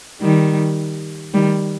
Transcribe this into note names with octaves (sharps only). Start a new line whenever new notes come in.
D#3 G3
D#3 G3